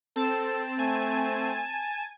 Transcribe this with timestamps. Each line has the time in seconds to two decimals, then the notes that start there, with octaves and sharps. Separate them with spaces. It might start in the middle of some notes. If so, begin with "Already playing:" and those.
0.16 C4 A4 A5
0.79 A3 G#5